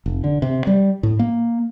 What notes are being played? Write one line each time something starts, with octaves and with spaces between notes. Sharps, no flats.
F1
D3
C3
G3
A2
A#3